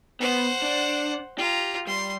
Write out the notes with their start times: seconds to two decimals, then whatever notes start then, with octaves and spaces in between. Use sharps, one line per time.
0.20 B3 C5 F#5
0.62 D4
1.38 F4 G4 A#5
1.87 G3 C6